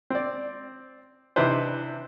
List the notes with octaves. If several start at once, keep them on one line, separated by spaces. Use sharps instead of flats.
C4 D5
C3 E3 D4 D#4 B4 C5